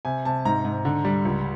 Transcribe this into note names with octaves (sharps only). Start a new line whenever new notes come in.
C3 G#5
C3 A5
G#2 A#5
G#2
D3
G3
C#2